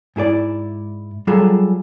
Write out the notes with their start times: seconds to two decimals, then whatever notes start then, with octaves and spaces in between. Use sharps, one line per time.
0.16 G#2 E4 G#4 D5
1.27 F#3 G3 F4 G#4 A4